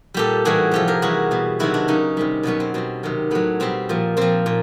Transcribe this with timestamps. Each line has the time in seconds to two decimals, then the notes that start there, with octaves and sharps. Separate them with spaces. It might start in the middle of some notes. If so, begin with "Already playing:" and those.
0.14 A#2 G3 G4 A4
0.45 A2 E3 G3 F#4 G#4
0.72 C3 F3 G4 A4
0.88 G#4 A#4
1.02 C3 E3 G3 F#4 G#4
1.31 B2 G3
1.59 C3 D#3 F#3 E4 F#4
1.74 D4 E4
1.88 C#3 F#3 C#4 D#4
2.17 C3 D#3 G3
2.43 B2 F#3 B3 C#4
2.60 C4
2.74 B2 G3 C4
3.03 C3 D#3 F#3
3.31 A2 F#3 B3
3.60 B2 G3 C4
3.89 A#2 F3
4.17 A#2 F3 C4
4.46 A#2